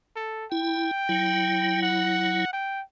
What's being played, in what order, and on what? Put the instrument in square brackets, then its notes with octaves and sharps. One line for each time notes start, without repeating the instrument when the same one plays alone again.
[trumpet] A4
[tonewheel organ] E4 [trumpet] G5
[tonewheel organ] F#3 E4
[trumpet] F#5
G5